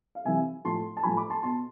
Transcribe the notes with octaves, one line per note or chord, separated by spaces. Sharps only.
F5
C3 E3 E5 G#5
A2 F3 A5 C6
A5
A2 F3 G#5 B5
B5 D6
A5 C6
B2 A5 C6